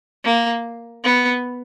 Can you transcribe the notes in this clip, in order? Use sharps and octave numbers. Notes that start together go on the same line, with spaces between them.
A#3
B3